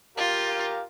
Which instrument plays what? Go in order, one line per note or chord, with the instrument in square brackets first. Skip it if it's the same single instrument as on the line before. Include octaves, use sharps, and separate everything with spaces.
[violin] F4 [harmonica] G4 A#4 F5